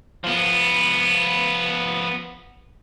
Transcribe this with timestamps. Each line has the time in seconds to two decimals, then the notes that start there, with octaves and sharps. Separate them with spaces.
0.24 F3 B3